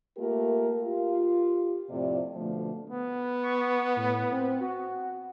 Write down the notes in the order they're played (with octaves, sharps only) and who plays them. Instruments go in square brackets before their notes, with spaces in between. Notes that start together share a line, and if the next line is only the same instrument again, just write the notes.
[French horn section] A3 A#3 F4 G4 A#4
F4 G4
F2 A2 C3 A3 D5
B2 D3 F3 A3
[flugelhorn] B3
[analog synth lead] C#6
A2
C4
F#4